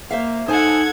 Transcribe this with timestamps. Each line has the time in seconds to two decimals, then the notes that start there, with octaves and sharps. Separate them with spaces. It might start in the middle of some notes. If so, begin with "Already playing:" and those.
0.10 A#3 C5 E5 F5
0.48 D#4 A4 C5 F#5 G#5 A5 G#6